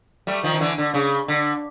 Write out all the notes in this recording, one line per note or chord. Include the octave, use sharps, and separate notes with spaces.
G3 A3
D#3 F3
D#3
D3 E3
D3
C#3
D3